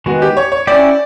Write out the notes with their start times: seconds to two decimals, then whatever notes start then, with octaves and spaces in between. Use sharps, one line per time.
0.06 D#3 G#3 B3 F#4
0.22 G4
0.37 C#5
0.52 C#5
0.67 C#4 E4 G4 D5